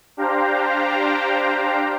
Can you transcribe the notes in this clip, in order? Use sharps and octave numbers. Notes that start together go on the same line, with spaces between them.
D4 G4 C5 F5 G5 A#5